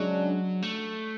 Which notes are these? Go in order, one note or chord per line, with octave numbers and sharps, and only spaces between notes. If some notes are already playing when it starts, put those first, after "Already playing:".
Already playing: C#3 F#3 G#3 D4
A3